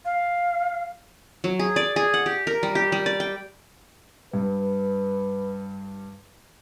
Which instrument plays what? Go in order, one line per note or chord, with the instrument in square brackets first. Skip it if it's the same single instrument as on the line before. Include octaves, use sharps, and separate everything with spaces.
[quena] F5
[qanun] F#3
G#4
D5
G#4
F#5
G4
A#4
G3
G4
G3
D5
G5
[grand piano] G2 [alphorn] B4